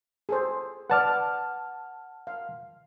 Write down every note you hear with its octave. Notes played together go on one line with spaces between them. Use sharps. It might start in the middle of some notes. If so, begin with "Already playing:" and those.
G#4 A4 C5
B4 D5 F#5 A5 F6
F5